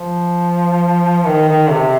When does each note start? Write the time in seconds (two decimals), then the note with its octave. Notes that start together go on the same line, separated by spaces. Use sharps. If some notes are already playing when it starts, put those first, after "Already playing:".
Already playing: F3
1.26 D#3
1.48 D#3
1.71 C3